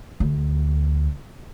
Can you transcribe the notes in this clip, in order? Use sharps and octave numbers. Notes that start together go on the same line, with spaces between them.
D2